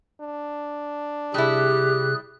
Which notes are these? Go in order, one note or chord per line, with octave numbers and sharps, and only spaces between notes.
D4
C3 G3 E4 G4 G#4 F#6